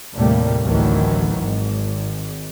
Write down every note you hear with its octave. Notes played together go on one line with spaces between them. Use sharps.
D#2 A2 C3 G3 A3 A#3
A1 D2 D#3 E3 F#3
G#1 G#2